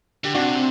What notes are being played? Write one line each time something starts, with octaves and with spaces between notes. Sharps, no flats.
D3 G4
C3 D4 F#4
C4